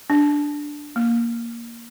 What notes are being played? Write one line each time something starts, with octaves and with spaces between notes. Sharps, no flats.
D4
A#3